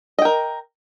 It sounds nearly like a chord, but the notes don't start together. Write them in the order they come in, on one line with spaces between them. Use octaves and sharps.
D#5 G5 A#4